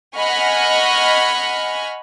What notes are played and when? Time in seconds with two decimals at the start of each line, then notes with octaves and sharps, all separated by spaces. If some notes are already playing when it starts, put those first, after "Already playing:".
0.16 D#5 F#5 G#5 B5 C#6 F6